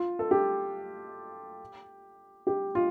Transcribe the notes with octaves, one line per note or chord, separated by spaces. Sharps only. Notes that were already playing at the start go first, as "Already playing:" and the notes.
Already playing: F4
A4
G4
G4
F4